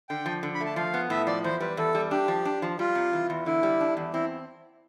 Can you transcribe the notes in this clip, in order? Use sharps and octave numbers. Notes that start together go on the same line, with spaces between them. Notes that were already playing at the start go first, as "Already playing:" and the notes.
D3 G5
F3
D3
B5
A3
A5
F3 F5
B3
A2 E5
F3 D5
E2 C5
G3 B4
E2 A4
G3
D4 G4
F3
D4
F3
G3 F4
C3
E3
E2
D3 E4
G3
D4
E2
C4 E4